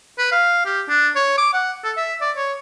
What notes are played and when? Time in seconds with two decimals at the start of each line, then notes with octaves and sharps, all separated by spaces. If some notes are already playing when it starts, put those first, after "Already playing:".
0.18 B4
0.32 F5
0.66 G4
0.89 D4
1.16 C#5
1.38 D6
1.54 F#5
1.84 A4
1.97 E5
2.21 D5
2.37 C#5